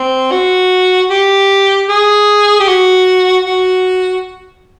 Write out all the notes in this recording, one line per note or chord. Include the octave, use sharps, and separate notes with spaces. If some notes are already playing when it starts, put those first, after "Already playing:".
Already playing: C4
F#4
G4
G#4
G4
F#4
F#4